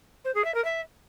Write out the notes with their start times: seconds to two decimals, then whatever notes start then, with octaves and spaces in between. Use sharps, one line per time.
0.24 C5
0.34 G#4
0.44 E5
0.54 A#4
0.64 E5